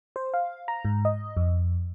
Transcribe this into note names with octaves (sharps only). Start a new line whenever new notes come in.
C5
F5
A#5
G#2
D#5
F2